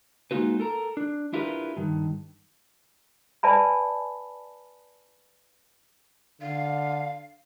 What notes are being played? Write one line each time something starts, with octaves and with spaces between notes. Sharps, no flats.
G#3 A#3 D#4 F4 F#4 B4
A4 A#4 A#5
D4
D4 E4 F4 G4 A#4 B4
G2 D#3
B4 D5 E5 G#5 A5 B5
D3 F5